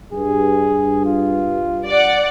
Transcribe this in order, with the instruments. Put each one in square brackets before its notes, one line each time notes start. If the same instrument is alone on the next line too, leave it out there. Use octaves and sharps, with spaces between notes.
[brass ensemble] G2 [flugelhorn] G#4
[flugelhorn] F4
[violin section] D5 F#5